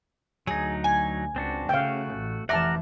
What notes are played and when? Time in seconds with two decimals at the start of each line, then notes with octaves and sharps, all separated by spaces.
0.47 D2 F#3 D#4 G#4
0.84 G#5
1.36 C#2 C4 D4 F#4
1.69 C#3 A3 F#4 F5 G5
2.15 A1
2.49 F1 E3 G4 E5 F#5 A5 A#5 F6